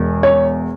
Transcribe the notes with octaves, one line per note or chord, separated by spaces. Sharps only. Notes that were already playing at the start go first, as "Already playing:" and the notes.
Already playing: E1 E2
C#5